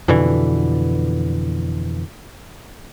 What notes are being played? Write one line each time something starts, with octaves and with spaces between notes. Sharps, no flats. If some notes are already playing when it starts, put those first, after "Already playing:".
F2 B2 D3 E3